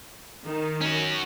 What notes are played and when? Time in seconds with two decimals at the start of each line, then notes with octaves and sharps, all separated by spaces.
0.45 D#3
0.81 C#4 F#4